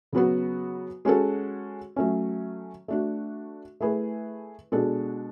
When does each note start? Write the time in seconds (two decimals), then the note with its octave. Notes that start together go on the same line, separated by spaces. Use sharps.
0.13 C#3 F#3 B3 F#4
1.05 G#3 C#4 F#4 A4
1.96 F#3 A3 C#4
2.88 A3 D4 F#4
3.81 A3 E4 G#4 B4
4.72 B2 G#3 D4 F#4 A4